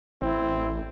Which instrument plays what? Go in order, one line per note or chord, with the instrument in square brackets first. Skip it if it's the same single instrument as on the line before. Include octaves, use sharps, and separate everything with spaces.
[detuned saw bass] A1 [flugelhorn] C4 [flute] E4